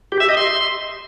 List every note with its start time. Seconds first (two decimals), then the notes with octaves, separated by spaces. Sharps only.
0.12 G4
0.20 E5
0.29 D#5
0.37 C6